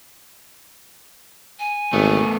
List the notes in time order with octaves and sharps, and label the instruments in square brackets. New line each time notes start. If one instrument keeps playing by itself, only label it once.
[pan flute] G#5
[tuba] G#1 [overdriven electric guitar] A3 B3